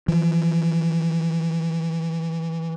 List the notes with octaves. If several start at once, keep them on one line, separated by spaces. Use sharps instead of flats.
E3 F3